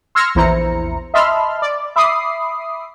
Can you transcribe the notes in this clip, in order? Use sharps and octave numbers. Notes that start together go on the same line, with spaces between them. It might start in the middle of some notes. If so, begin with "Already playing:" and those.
C6 E6 F6 G#6 A#6 C#7
A#1 E2 E4 C5 A#5 C#7
D#5 E5 A5 B5 C6 F6
D5
E5 B5 D6 D#6 C7